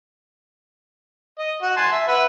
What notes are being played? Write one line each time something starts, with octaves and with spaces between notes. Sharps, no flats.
D#5
F#4 F#5
G#5 A5 C6
E5
B4 E5 F#5